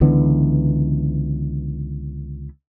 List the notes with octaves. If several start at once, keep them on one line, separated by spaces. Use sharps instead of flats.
C#2 D3 E3 B3